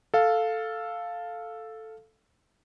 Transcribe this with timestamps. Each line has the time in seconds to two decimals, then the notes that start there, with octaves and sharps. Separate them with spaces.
0.14 A4 F5